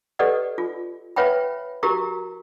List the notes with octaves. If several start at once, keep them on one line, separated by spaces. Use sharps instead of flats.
G4 A4 B4 D5 D#5 F#5
F4
B4 C#5 E5 F#5 G5 B5
E4 F#4 G4 A#4 A#5 C#6